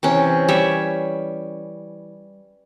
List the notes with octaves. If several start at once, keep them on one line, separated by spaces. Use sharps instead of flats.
C3 E3 C#4
G3 C#5 E5